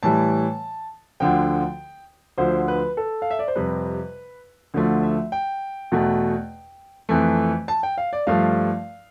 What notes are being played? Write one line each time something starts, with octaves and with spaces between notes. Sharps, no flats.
A2 E3 G3 A5
D2 D3 F3 G5
D2 D3 F3 C5
B4
A4
F5
E5
D5
C5
F2 C3 G3 B4
D2 D3 F3 A3
E5
G5
E2 B2 A3
F2 E3 A3
A5
G5
F5
D5
G2 F3 A3 F5